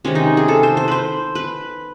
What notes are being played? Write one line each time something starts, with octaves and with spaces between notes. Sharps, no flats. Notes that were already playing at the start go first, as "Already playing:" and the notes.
C3 D#3 G#3 C#4
D#4
G#4
A4
C5
C5
B4 C5
B4